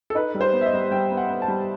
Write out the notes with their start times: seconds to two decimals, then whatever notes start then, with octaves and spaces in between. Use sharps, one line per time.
0.10 A4
0.15 D#4 B4
0.35 G3
0.41 C5
0.53 B3
0.61 E5
0.66 D#5
0.73 G3
0.91 G3 G5
1.11 B3
1.17 F#5
1.30 B3
1.42 A5
1.48 G3